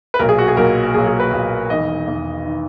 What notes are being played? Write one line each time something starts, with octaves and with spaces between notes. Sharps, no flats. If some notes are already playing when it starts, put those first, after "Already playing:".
B4
B1 A#2 F#3 A#4
G#4
F#4
G#4
B1 A#2 F#3 A#4
B1 A#2 F#3 G#4
G#4
B4
B1 A#2 F#3
E1 E2 D#3 D#5
E1 E2 D#3
D#3